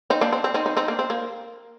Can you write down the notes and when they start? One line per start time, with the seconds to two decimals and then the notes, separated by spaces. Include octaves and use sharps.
0.10 C4 D#4
0.21 A#3 D4
0.33 C4
0.44 C4
0.54 C4 D#4
0.66 C4 D#4
0.77 C4 D#4
0.88 A#3 D4
0.99 C4
1.10 A#3